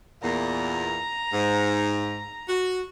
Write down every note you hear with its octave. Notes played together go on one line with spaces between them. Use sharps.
E2 A#2 A#5
G#2
F#4